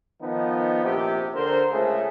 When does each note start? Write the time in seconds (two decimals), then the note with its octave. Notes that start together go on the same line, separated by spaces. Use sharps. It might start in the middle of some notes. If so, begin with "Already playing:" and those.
0.21 D#3 F3 B3 D#4
0.84 A#1 C3 G4
1.35 D3 A#4 C5
1.72 C#2 C#3 A3 G#4